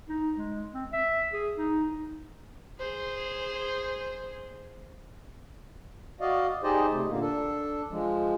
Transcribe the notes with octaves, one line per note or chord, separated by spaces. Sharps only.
D#4
G#3
C4
E5
G#4
D#4
G#4 C5
F#4 D5 D#5 F5
D#4 G4 G#4 C5 D5 D#5
C3 A3
A#2 D3 A#3
D4 A4
F3 G#3